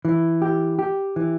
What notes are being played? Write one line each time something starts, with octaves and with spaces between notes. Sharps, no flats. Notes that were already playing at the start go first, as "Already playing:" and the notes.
E3
G4
G4
E3